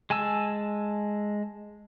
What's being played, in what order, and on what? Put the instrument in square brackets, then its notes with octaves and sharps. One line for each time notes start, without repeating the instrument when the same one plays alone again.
[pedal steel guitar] G#3 G#5 A5 E6